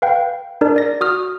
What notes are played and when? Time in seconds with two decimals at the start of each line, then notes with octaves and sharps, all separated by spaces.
0.02 B4 F5 G5
0.61 D4 D#4 G#4 A#4 D5
0.76 D5 A#6
1.01 F#4 D#6 F6